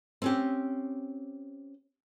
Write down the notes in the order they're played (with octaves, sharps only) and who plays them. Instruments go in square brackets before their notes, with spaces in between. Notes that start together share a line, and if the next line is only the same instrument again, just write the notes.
[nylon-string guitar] C4 C#4 G4